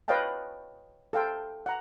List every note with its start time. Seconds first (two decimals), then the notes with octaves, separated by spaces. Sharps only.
0.08 B4 C#5 D#5 F5 G5 A5
1.13 A4 F5 G5 C6
1.66 F#5 A#5